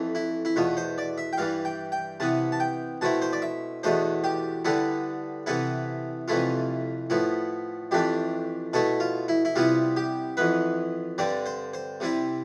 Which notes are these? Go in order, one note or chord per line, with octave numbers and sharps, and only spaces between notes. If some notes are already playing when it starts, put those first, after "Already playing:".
Already playing: F2 E3 A3
E4
E4
E2 B2 A3 F4
C5
D5
E5
G5
G2 E3 G3 F5
G5
G5
C3 E3 B3 A5
A5
G5
B2 A3 C4 E4 A5
C5
D5
E5
E2 B2 A3 D4 C5
G4
D3 G3 B3 E4 A4
C3 E3 B3 E4 A4
F2 C3 E3 A3 E4 F4
A2 F3 B3 E4
F2 E3 A3 D4 G4
B2 A3 E4 A4
F4
E4
E4
C3 G3 B3 E4 F4
G4
F2 E3 B3 B4
G2 D3 G3 C4 D5
C5
C5
C3 G3 C4 E4